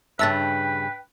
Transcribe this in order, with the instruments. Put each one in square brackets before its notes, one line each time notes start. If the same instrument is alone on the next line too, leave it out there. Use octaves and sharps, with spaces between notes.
[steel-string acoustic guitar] G2 C#3 [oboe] B4 [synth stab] E5 A5 [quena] G5